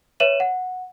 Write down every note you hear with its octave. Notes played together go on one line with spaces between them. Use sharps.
B4 C#5 E5 D#7 E7 F#7
F#5